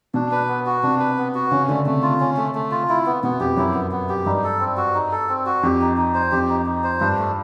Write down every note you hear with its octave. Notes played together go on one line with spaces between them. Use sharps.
B2 D4
B4
B3
F#4
C3 D4
B4
B3
F#4
C#3 C#4
D3 A3
C3 A3
F4
C#4
A3
A3
F4
E4
B3
B2 B3
F2 G4
F#2 E4
B3
B3
G4
G2 D#4
A4
C4
F#4
D#4
A4
C4
F#4
F2 G4
D#4
D#4
C5
F2 G4
D#4
D#4
C5
G2 D4
A3